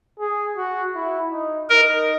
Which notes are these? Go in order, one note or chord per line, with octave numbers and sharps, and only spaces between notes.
G#4
F#4
E4
D#4
D#4 A#4